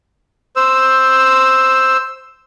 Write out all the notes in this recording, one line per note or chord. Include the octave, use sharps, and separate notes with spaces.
C5 E6